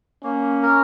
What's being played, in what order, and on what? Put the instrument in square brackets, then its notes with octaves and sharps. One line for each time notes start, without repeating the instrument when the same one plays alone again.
[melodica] A#3 [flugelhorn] C#4
[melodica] A#4